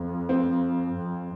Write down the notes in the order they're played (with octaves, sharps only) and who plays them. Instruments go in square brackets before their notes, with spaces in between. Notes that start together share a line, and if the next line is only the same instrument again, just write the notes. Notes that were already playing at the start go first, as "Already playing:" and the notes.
Already playing: [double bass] F2
[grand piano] C4
[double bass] F2